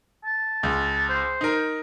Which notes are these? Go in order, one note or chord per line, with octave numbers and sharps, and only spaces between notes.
A5
C#2
C5
D#4 A#4